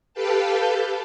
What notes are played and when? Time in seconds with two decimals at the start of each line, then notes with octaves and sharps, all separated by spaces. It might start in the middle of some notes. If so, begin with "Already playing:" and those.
0.14 G4 A4 B4 F5 G5 A5